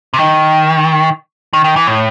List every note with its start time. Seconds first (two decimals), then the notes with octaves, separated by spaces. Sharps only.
0.14 C3
0.18 D#3
1.53 D#3
1.64 D#3
1.76 E3
1.87 A2